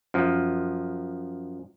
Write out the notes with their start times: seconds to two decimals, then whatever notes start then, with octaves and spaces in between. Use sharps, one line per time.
0.14 F#2 F3